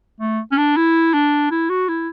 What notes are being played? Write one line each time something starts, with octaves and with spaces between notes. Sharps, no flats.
A3
C#4
D4
E4
D4
E4
F#4
E4